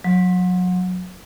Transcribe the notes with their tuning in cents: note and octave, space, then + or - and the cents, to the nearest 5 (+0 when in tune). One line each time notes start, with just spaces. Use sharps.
F#3 -30